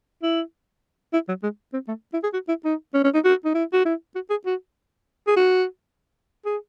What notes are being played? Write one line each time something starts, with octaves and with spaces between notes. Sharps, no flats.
E4
E4
F#3
G#3
C4
A3
E4
G#4
F#4
E4
D#4
C#4
C#4
D#4
F#4
D#4
E4
F#4
E4
F#4
G#4
F#4
G#4
F#4
G#4